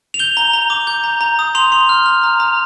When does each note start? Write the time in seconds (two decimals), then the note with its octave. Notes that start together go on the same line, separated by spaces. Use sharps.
0.14 F7
0.19 G6 G7
0.37 A#5
0.53 A#5
0.70 D6
0.87 G6
1.04 A#5
1.21 A#5
1.39 D#6
1.55 C6 F7
1.72 C6
1.89 F6
2.06 F6
2.23 A#5
2.40 A#5